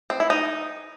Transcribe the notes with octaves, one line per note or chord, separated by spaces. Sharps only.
C4
E4
D#4